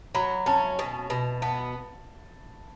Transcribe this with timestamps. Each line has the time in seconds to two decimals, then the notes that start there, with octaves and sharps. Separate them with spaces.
0.15 F#3 B5
0.46 C#4 A5
0.79 B2
1.10 B2
1.42 B3 A5